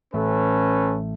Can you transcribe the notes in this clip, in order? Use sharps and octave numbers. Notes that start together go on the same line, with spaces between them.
A1 A3 C#4 A4 B4